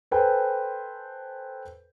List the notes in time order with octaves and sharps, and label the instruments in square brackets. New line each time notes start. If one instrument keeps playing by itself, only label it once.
[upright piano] A4 B4 C5 G5 G#5